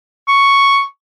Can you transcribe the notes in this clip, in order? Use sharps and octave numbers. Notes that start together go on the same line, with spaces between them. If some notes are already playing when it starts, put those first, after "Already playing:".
C#6